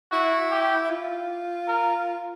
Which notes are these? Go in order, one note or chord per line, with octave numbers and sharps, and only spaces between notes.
E4 F#4
G4
F4
A#4